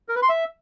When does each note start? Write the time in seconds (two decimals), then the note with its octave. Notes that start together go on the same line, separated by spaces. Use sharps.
0.09 A#4
0.15 B4
0.22 C6
0.29 E5